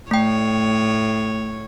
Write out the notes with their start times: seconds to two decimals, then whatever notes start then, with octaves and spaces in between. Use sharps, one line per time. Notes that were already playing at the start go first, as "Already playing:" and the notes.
0.11 A2 A3 C#5 G5